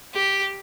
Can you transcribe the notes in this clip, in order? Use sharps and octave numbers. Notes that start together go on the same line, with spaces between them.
G4